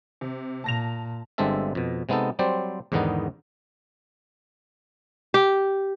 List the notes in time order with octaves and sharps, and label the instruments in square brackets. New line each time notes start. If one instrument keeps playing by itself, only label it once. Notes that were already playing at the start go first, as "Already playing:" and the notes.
[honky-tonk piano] C3
[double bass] A#2 [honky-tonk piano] A5 A#6 F7
[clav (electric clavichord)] G1 G2 G#3 C4 A4 E5
F2 B2
C3 G#3 B3 D#4 A4
F#3 G3 C4 C5 D5
E2 G#2 D3 D#3 B3 D#4
[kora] G4